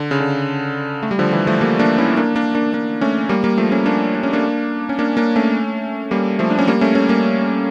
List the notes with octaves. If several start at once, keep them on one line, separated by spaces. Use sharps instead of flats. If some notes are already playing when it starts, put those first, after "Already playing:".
Already playing: D3
C#3
D3
A3
G3
D3 F3
E3 G3
F3 A3
G3 A#3
A#3 D4
C#4 E4
A#3 D4
A#3 D4
A#3 D4
A#3 D4
A3 C#4
G3 A#3
G3 A#3
F3 A3
A3 C#4
A#3 D4
D4
C#4
A#3 D4
C#4
A#3 D4
A#3 D4
A3 C#4
G3 A#3
F3 A3
D4
C#4
G3 A#3
A3 C#4
A3 C#4
G3 A#3